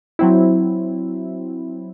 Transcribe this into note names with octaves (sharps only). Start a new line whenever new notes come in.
F#3 C4 E4